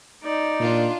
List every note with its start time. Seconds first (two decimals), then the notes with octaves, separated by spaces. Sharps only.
0.24 D#4 D5
0.60 A#2 D4 F4